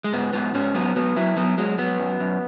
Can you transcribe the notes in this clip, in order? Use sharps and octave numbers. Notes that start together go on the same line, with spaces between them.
G#3
G#2 B3
G#2 B3
G#2 C#4
F#3 B3
F#3 B3
F#3 E4
F#3 B3
F#3 G#3
F#3 B3
F#2
F#2